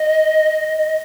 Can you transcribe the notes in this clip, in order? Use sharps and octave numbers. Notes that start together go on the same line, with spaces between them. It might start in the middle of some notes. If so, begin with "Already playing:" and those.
Already playing: D#5